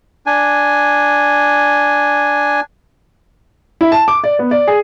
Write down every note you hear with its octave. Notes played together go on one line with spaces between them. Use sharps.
D4 G#5
E4
A5
D6
D5
B3
D5
G#4